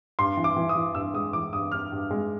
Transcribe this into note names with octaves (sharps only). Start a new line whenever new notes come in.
G2 C6
E3
D6
E3
D#6
E3
G2 E6
G#3 D#6
E3 D6
G2 D#6
G2 F6
G2
G#3